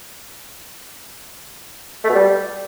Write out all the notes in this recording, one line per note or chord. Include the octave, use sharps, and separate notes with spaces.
A3
B2
G3